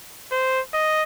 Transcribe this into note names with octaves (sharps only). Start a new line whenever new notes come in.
C5
D#5